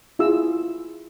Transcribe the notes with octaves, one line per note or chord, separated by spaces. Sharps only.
E4 F4 G#4 E6